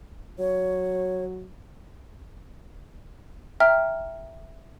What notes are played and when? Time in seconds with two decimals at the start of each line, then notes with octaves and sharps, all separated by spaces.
0.39 F#3 C#5
3.60 E5 G5 A#5 F6